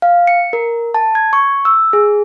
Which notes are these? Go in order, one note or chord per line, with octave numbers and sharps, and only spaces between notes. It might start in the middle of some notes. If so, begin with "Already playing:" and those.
F5
C#7
A#4
A5
G#6
C#6
E6
G#4